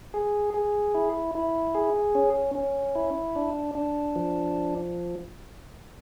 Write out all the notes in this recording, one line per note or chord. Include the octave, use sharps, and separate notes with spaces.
G#4
G#4
E4
E4
G#4
C#4
C#4
E4
D4
D4
F3